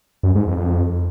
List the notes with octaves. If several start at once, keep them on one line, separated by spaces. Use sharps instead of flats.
F#2
G#2
F2
F2